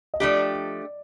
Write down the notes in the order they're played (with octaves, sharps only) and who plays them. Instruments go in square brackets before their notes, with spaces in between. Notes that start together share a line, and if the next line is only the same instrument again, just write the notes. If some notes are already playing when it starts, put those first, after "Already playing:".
[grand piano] D#5
[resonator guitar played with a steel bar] F3 A3 D4 G4 [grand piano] D5